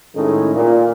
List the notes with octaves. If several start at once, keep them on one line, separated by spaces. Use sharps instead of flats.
A2 D#3 G#3 A3 C#4 D#4
A#2